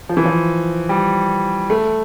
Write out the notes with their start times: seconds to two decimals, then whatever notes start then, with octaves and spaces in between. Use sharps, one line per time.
0.09 F3
0.17 E3
0.25 F3
0.89 G3
1.70 A3